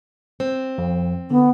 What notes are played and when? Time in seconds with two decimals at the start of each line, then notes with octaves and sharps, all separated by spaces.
0.40 C4
0.78 F2
1.30 D3 B3